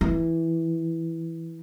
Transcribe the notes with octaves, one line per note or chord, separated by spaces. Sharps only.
E3